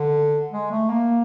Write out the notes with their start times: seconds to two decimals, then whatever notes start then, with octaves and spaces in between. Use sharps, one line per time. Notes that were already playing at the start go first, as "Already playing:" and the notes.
Already playing: D3
0.52 G#3
0.71 A3
0.90 A#3